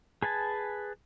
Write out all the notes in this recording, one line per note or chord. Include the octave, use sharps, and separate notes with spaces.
G#4 B4 G#5 A5